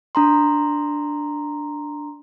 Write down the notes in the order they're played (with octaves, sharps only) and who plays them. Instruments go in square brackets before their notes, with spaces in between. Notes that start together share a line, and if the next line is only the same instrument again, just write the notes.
[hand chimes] D4 A#5 C6